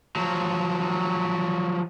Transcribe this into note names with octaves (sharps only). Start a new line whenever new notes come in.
F3 F#3